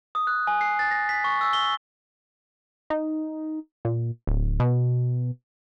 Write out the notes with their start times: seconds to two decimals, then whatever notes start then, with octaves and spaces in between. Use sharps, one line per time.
0.15 D#6
0.27 F#6
0.47 G#5
0.61 C7
0.79 A6
0.91 A#6
1.09 B6
1.24 C#6
1.41 E6
1.53 G7
2.90 D#4
3.85 A#2
4.27 D1
4.60 B2